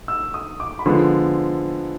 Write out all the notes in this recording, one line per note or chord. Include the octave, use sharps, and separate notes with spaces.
E6
D#6
D6
B5
D3 F3 G#3 B3 C6